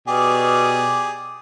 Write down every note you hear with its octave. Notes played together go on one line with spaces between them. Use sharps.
B2 G4 G#4 D5